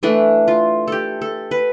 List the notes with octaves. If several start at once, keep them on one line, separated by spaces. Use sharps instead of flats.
E3 A3 D4
F4
G4 A4
A4
B4